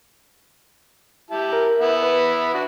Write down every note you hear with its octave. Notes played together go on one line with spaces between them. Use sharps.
E4 G4 A5
A#4
B3 E4
B4
D4 F#4